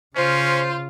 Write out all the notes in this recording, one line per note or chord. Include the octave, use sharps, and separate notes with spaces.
C#3 C#4 F4 C5